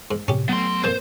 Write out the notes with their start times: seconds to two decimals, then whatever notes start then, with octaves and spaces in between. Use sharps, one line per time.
0.11 G#2
0.28 A2 C3 C#4 G4
0.49 F#3 A3 B3 C6
0.84 F2 A#2 C5